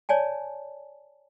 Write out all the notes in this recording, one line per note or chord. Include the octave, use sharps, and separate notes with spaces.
C#5 D5 G#5 A5